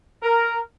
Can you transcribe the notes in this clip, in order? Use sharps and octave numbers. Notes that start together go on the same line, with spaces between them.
A#4